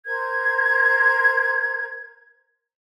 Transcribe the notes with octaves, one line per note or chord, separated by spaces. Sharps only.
A#4 C5 A#5 G#6